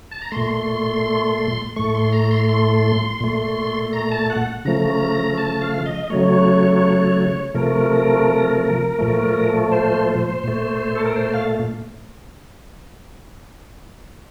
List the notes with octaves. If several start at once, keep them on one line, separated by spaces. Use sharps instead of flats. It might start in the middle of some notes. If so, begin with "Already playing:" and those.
A5
A#5
A#2 A3 C6
A2 A3 C#6
C6
A#5
C6
C6
A#2 A3
A#5
A5
F#5
C#3 F3 A3 A#5
A5
F5
D#5
C#3 F#3 A3 C#5
C3 F3 A3 A#4
A#2 F3 A3
C5
A#2 A3
A4
A#4
C5
F5